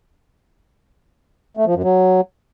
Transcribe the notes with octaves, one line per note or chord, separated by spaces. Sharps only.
A3
F3
F#2
F#3